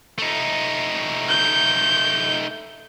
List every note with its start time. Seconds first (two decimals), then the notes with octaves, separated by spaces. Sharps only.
0.18 A3 D#4
1.29 G6